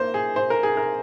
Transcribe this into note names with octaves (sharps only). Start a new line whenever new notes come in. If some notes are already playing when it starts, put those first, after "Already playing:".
Already playing: A#3 C5
G#4
C5
A#4
G#4
A#4